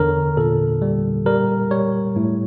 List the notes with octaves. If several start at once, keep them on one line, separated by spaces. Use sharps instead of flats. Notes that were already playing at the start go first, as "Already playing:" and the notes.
Already playing: E2 D3 A#4 C#5
A#2 A4
G3
G3 A#4
G3 C#5
A2